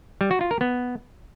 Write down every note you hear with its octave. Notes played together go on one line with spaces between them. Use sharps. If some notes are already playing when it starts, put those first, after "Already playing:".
G3
F#4
F4
A#4
B3